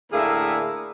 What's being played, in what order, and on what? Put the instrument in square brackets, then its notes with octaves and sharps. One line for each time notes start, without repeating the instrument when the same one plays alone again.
[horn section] A2 D3 A#3 G#4 A#4 E5